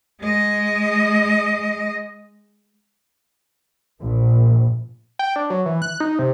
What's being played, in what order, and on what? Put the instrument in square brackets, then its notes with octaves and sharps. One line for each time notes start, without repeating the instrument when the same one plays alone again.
[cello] G#3 D#5
[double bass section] A#1
[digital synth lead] G5
D4
F#3
E3
F#6
D#4
C3